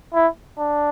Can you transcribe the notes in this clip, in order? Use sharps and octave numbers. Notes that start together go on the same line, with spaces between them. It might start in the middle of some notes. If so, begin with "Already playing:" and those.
E4
D4